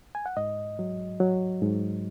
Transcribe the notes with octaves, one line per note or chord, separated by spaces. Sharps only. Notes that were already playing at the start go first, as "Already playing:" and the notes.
G#5
F#5
G#2 D#5
F#3
F#3
G#2